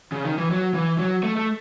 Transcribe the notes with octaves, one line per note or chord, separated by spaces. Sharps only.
C#3
D#3
E3
F#3
E3
F#3
A3
A3